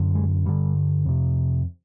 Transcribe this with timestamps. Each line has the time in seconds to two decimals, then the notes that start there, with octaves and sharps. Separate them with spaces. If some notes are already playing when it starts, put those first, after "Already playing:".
Already playing: F#2 D3
0.15 G#3
0.45 G2 D3 G3
1.06 F2 C3